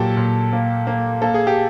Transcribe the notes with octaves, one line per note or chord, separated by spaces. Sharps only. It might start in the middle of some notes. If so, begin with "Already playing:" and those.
Already playing: A#2 F#3 G4 A4
A#2
A#3
A#3
A#3 A4
G#4
G4